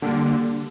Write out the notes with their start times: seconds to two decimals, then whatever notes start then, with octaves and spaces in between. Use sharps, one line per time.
0.02 A#2 D3 G3 A#3 D4 G4